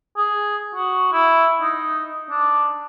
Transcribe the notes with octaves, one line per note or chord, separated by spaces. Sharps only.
G#4
F#4
E4
D#4
D4